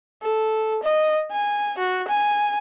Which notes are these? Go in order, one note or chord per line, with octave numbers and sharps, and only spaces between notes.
A4
D#5
G#5
F#4
G#5